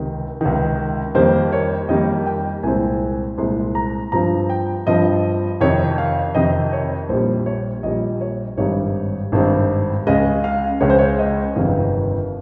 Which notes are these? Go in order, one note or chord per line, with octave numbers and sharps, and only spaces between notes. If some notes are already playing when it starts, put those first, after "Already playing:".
Already playing: C#2 C3 D#3
C#2 C3 D#3
F2 D#3 G3 A#3 C5
C#5
F2 D#3 G3 A#3 D#5
G5
C2 A#2 G#3 C4 G#5
C2 A#2 G#3 C4 C6
A#5
G2 F3 C4 A#5
G5
G2 F3 C4 D#5
F2 C3 D#3 C#5
F5
F2 C3 D#3 D#5
C#5
A#1 A#2 G3 C5
C#5
A#1 A#2 G3 D#5
C#5
G#1 G2 G3 C4 D#4 C#5
G#1 G2 G3 C4 D#4
C#2 C#3 G#3 D#5
F5
C#2 C#3 G#3 C#5
C5
C#5
D#5
G1 F2 C3 D#3 F5